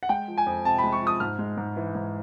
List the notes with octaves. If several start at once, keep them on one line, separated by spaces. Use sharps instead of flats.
F#5
G#3 G5
F3
G#5
F2
C3 A5
B5
G#3
C#6
F3 D#6
G#2 F6
G#3
G#2
E3
G#2